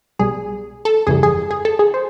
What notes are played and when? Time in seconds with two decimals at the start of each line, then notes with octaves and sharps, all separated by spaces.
0.19 B1 B2 G3 G#4
0.85 A4
1.07 G1 F2 C#3 E3 G3 G#4
1.23 G#4
1.51 G#4
1.65 A4
1.79 G#4
1.94 C5